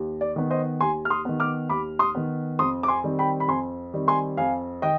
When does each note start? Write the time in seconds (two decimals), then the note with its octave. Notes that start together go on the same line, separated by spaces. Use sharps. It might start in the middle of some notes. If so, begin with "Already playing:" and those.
Already playing: D#2
0.21 D5
0.36 D#3 B3
0.50 C5 D#5
0.81 D#2 G#5 C6
1.05 F6
1.10 C6 D#6
1.25 D#3 B3
1.40 D6 F6
1.69 D#2 B5 D6
1.99 C6 D#6
2.15 D#3 B3
2.59 F2 C6 D#6
2.83 D6
2.88 G#5 C6
3.04 D#3 G3 C4
3.19 G5 B5
3.40 B5
3.48 F2 G#5 C6
3.94 D#3 G3 C4
4.08 G#5 C6
4.37 F2 F5 G#5
4.82 D#3 D#5 G5